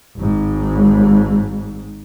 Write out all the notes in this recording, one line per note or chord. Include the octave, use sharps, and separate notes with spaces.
G#1 G#2